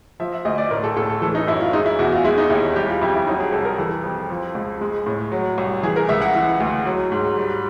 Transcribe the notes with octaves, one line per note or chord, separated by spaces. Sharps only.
F3 E5
E5
D2 D#5
D5
A2 A#4
A4
A2 A4
A4
E3 A4
D#4
F#2 E4
F4
G#3 D#4
E4
E2 F#4
F4
G#3 E4
D#4
D#2 E4
G3 G4
F4
F2 E4
E4
F#3 D#4
G#4
C2 A4
A#4
E3 A4
F2
F3
C#2
G#3
A2
F#3
C2
E3 G#4
A#4
C#2 E5
F#5
E3
D2
F#3
G#2
G3